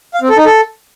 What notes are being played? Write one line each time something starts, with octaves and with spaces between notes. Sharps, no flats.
F5
C4
A4
D#4
A4